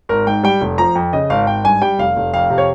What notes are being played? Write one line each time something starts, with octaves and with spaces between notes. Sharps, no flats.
G#1 A#4
G#2 G5
G3 G5
F1
F3 A#5
F2
C#3 D#5
G#1 F5
G#1 G5
G2 G#5
G3 G5
F1 F5
F1
F2 F5
C3
C#5